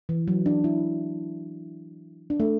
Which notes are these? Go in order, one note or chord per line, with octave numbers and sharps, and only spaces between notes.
E3
F#3
D4
E4
D4
A3